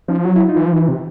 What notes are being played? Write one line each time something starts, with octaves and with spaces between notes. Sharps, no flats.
F3 C#4 D#4
F#3 F4
E4
D#4 F4
E3
F3
E3
C3